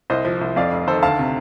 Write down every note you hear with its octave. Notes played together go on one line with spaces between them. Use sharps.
C2 C5 D#5
F3
C2
F2 D5 F5
F1
D#3 A4 C5
D2 F5 A5
C3